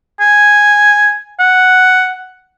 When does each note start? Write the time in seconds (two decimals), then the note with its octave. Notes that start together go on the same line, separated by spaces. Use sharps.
0.20 G#5
1.39 F#5